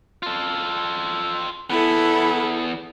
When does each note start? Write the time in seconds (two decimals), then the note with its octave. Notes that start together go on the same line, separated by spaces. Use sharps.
0.23 F4 A4
1.70 E2 B3 E4 A4